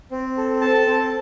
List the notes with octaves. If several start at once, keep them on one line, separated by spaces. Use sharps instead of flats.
C4
A4
A4 A5
C4